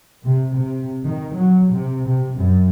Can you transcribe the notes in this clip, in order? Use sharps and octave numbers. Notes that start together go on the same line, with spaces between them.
C3
C3
D#3
F#3
C3
C3
F#2